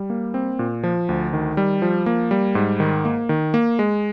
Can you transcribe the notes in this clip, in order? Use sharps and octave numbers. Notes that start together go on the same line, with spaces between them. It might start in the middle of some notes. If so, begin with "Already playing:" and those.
Already playing: G3
A#3
C4
A#2
F3
D2
D#3
G3
F3
A#3
G3
G#2
D#3
A#3
D#3
A#3
G#3